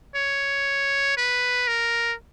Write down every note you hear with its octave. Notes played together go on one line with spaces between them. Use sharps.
C#5
B4
A#4